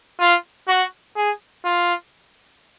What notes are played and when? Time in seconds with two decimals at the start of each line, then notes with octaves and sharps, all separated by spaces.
0.20 F4
0.68 F#4
1.17 G#4
1.65 F4